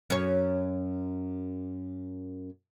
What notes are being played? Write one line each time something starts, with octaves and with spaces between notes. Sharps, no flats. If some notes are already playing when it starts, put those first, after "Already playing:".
F#2 C#5